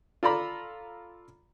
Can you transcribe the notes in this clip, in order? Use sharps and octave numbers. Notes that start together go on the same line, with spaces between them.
F4 A4 D5 A#5 B5